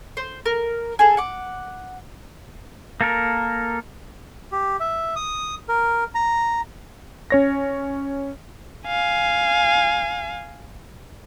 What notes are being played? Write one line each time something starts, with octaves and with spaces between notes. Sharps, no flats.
C5
A#4
G#4 A4
F#5 D6
A#3 A4 A#4
G4
E5
D#6
A#4
A#5
C#4 C#5 A#6
F5 G#5